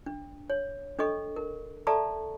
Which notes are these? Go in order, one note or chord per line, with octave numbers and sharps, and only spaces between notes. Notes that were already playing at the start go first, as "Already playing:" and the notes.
D4
C#5
D4 A4 D#5 C#6
A#4
A4 D5 E5 A5 A#5 C#6